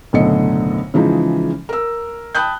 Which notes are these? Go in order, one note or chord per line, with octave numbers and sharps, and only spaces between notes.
F#1 B1 A2 D3 D#5 C#7
C#3 E3 F3 G#3 D#4
A#4 E6
G5 A5 B5 D#6 F#6 G6